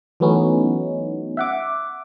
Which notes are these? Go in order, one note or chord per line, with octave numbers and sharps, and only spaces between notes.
E3 F#3 A3 B3 C#4 D#4
E5 F#5 D6